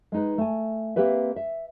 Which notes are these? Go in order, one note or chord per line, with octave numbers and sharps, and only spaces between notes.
G#3 D#4 B4
A3 G#5
A#3 C4 G4 B4 E5
E5